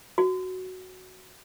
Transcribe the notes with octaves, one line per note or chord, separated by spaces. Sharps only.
F#4